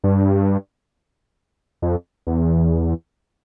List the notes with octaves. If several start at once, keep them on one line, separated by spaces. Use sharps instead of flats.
G2
F2
E2